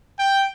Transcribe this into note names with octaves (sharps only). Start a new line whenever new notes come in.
G5